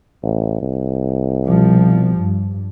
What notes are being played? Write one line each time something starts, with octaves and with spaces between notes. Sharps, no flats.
A1
C2
B2 F3 G3
G2